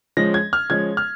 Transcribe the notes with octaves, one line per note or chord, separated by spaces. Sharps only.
F3 G#3 C#4 A#6
G#6
F6
F3 G#3 C#4 G#6
F6